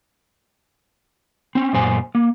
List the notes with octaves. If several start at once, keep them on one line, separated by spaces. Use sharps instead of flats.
C4 C#4
F#2 A#2 C5 G#5
A#3